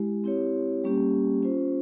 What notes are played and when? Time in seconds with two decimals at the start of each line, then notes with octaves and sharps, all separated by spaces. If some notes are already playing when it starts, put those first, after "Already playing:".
Already playing: G#3 E4 G4
0.24 C4 E4 G4 C#5
0.84 G3 A#3 C#4 G4
1.43 C#4 F4 C5